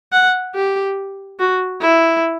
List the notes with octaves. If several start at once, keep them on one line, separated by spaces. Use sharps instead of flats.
F#5
G4
F#4
E4